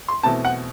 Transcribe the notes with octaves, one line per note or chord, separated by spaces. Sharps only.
C6
E2 B2 A3 C4 A5
F#5